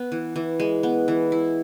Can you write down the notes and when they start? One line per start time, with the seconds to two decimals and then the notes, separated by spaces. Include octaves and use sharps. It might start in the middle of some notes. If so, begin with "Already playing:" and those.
Already playing: B3
0.12 E3
0.36 E3
0.60 G#3
0.83 B3
1.08 E3
1.32 E4